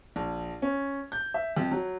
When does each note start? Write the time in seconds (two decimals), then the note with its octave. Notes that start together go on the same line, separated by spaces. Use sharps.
0.16 A#1
0.62 C#4
1.12 G6
1.34 E5
1.57 F2
1.71 F#3